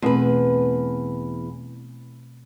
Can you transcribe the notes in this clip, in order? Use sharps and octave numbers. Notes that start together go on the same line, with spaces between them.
E2 B2 A3 C4 B4